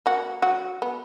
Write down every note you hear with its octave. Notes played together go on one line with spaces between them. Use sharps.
A#3 F#4
F#3 F#4
B3